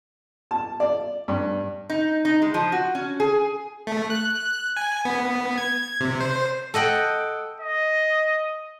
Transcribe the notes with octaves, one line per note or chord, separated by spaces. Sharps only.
A5
D5
G2
D#4
D#4
G#3
F3
F#4
C#4
G#4
A3
F#6
G#5
B3
G#6
C3
C5
A4 D#5 F#5 G5
D#5